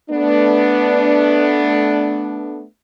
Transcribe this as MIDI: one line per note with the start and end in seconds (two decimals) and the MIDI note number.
0.11 2.63 57
0.11 2.63 59
0.11 2.63 62